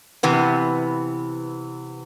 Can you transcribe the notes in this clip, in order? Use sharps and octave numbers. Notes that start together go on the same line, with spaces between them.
C3 E3 B3